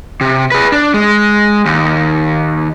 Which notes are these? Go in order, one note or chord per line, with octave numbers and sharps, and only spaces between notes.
C3
G#4 B4
D4
G#3
D#2